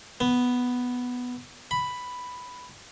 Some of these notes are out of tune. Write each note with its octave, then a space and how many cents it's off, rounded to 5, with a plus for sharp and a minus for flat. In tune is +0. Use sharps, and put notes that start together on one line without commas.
B3 +0
B5 +5